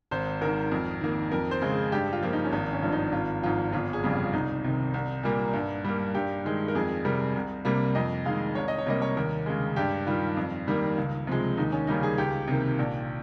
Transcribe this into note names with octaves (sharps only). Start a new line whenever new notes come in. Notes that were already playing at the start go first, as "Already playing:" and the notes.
G#1 C5
G#2 D#3 A#4
F2
D#3 A#3
F2 A#4
C5
C#3 G#3
G#4
G2 G4
F4
F3 A#3
D#4
C#4
G#1 D#4
C#4
G2 F3
D#4
G#1 F4
G#2 F3 F4
G1 F4
G#4
F2 C#3 G3
F4
C2 D#4
C3 D#3
C2
A#2 G3 A#3
G2
G3 A#3
G2 G4
D#3 G#3
A#4
F2 G#4
C3 G3 A#4
C2
C3 G3 A#3
F2 D#5
D#3 G#3 F5
C2 C#5
D#5
C#5
C3 G3 A#3 D#5
C#5
D#2 A#4
C#3 G#3
G2 G4
D#3 G3 F4
F2
D#3 G3 A#3
C#2
C3 F3 G#3
D#2 D#4
C#4
C#3 G3 A#3 D#4
G#4
C#2 G4
C3 D#3 A#3
A#1